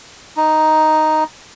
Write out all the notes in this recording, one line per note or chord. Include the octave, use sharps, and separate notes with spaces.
D#4